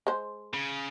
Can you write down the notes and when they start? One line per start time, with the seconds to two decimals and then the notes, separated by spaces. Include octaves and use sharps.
0.07 G#3 C5
0.54 C#3